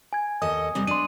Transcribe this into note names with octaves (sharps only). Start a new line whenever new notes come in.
G#5 G#6
D#2 A4 D#5 D#6
C3 G3 C4
D4 C6 D#7